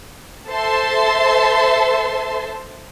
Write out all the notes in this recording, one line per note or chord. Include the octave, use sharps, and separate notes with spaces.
A4 C5 E5 A5 C6